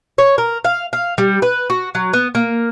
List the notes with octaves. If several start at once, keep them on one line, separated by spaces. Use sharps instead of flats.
C#5
A#4
F5
F5
G3
B4
F#4
F#3
B3
A#3